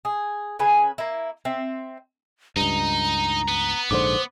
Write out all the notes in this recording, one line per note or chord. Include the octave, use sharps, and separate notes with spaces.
G#4
C#3 B4 G#5
A#3 E4
C4 E5
C#2 G2 D#4 A#5
B3
A#1 G#2 D3 C5 D6